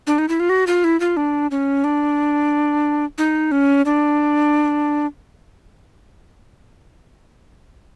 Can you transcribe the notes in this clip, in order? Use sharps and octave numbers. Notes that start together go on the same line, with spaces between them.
D4
D#4
E4
F4
F#4
F4
E4
F4
D4
C#4
D4
D#4
C#4
D4